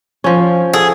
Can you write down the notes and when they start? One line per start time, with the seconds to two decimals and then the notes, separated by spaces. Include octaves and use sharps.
0.24 F3 C#4
0.73 G#4 A4